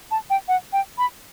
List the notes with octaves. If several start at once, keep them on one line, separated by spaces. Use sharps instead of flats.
A5
G5
F#5
G5
B5